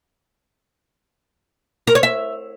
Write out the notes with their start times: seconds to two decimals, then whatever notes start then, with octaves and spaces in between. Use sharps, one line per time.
1.87 A#4
1.95 C#5
2.03 E5